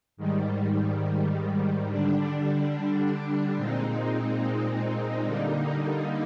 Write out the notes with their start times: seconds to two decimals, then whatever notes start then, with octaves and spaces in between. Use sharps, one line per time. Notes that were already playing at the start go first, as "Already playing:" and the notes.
0.17 G#2 D#3 G3
1.86 D3 G3 D4
3.56 A#2 G#3 C4 D#4
5.25 D3 G3 A#3 D#4